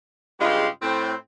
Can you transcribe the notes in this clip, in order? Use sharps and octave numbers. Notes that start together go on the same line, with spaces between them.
G2 C#3 G#3 F4 G4
A2 C4